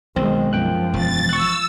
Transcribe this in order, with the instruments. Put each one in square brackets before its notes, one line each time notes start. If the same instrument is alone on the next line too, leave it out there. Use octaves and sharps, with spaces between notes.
[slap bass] B1 [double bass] D#3 G#3 [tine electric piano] C4
[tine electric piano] F#2 G5 F#6 [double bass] F3
[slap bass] E1 [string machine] A6
[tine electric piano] C#6 F#6 [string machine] E6